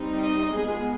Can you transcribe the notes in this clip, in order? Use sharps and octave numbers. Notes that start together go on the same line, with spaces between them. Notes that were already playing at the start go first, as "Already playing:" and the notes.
Already playing: G3 C4 D#4
D#5
G#3 B3 F4 G#4